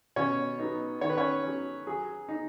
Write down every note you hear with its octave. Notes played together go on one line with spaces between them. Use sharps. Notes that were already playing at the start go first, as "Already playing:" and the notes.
B2 C#4 C#5
F#3 B3 D#4
D#3 C#5
B4
C#4 C#5
F#3 C#4
F#3 G#4
D#4